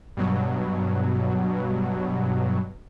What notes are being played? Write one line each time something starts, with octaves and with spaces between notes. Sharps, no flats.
G2 B2 F#3